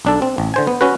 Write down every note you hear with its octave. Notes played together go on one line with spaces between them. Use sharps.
B1 D4 A4
C4
A1
D3 C5 G#5
B3
C#4 F#4 B4